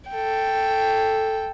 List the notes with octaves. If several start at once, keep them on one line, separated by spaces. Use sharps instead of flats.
A4 G5